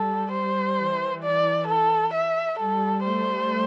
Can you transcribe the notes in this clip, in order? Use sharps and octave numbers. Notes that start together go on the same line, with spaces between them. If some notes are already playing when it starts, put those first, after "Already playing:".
Already playing: G3 A4
G3 C5
E3
D5
A4
E5
G3 A4
A3 C5